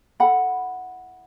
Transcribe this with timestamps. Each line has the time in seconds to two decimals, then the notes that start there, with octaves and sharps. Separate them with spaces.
0.20 E4 A4 F#5 B5